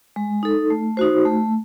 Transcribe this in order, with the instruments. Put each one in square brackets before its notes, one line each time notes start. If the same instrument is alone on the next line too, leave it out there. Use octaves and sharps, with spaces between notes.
[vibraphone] G#3
D#4 A4
A3
D#4 F#4 C5
A3